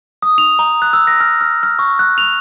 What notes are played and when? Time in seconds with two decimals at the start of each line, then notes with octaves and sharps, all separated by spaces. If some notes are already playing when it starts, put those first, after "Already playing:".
0.23 D#6
0.38 F7
0.59 A#5
0.82 F#6
0.93 E6
1.07 A#6
1.20 F6
1.41 F6
1.63 F6
1.79 C#6
1.99 F#6
2.18 F7